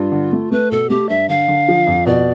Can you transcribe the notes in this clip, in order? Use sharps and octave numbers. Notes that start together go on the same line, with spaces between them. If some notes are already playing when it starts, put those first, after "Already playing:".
Already playing: G2 F4
D3
A3
A3 B4
B2 A4
A3 G4
G2 E5
D3 F5
D3
F3
F2
B2 D5